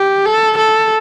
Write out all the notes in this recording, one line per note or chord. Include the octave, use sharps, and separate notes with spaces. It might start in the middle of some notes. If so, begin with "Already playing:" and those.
Already playing: G4
A4
A4